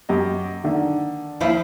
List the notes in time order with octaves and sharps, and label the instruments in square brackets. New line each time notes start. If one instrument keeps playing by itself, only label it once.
[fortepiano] F#2 G4 D#5
D3 D#3
[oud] D#2 F3 E4